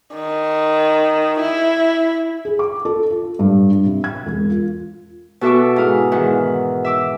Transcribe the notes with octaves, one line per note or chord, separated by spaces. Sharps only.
D#3
E4
G#4
D6
A4
F4
G2
G2
C3
G#6
E1
F4
B2 F#4 A4 E5 C#6 D6
G#2 E4 F5 D#6
G#2 D#3 E3 F#5
E5 D6 E6